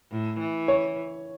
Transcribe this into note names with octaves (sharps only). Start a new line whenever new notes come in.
A2
E3
C#5